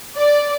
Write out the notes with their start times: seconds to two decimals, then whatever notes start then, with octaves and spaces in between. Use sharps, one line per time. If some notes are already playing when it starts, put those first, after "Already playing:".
0.17 D5